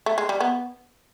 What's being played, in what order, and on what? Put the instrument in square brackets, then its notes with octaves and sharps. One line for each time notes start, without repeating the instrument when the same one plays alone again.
[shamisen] A3
G#3
G3
B3